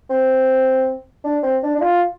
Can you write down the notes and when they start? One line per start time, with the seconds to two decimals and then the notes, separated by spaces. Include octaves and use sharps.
0.10 C4
1.24 D4
1.43 C4
1.63 D4
1.76 D4
1.81 F4